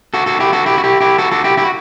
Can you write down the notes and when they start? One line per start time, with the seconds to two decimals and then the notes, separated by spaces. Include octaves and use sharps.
0.14 F#4 A4
0.26 F#4 A4
0.40 E4 G4
0.53 F#4 A4
0.66 E4 G4
0.78 F#4
0.84 E4 G4
1.01 E4 G4
1.18 F#4 A4
1.31 F#4 A4
1.44 E4 G4
1.57 E4 G4
1.65 F#4